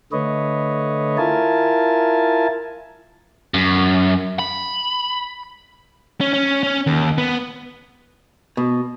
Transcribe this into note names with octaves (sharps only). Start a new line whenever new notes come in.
D3 A3 B4 C#5 D#5
E4 F4 A#4 G#5 A5
F#2
B5
C#4
C#4
C#4
D#2
B3
B2